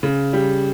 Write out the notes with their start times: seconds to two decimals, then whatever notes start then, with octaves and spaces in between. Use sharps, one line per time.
0.03 C#3
0.33 G3